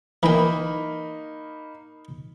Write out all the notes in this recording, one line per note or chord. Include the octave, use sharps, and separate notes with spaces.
E3 A#3 D#4 G5 B5